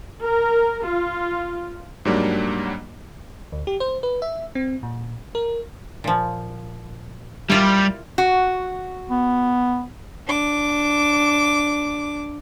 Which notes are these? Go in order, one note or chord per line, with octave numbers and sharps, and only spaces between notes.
A#4
F4
G#2 F#3 G3 A#3 D4
D2
G4
C5
B4
E5
C4
A#2
A#4
A#2 F3
G3 E4 F4 A#4
F#4
B3
D4 D6